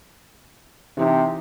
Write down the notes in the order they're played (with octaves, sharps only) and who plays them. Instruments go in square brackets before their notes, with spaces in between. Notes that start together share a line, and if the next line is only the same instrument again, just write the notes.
[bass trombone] C3 [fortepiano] E3 D#4